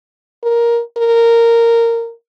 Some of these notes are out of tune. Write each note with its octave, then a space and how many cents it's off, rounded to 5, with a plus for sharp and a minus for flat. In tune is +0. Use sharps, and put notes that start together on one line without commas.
A#4 +10
A#4 -10